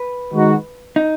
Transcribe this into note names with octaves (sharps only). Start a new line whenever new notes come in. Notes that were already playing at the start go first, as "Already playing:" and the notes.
Already playing: B4
D#3 G#3 D#4 F#4
D#4